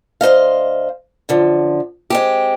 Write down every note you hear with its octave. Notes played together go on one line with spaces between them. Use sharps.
D2 C5 D#5 F5
F#2 D3 F3
G#3 C4 G4